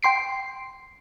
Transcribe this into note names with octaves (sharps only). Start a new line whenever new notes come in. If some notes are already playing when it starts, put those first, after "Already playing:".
G5 C6 C7 D7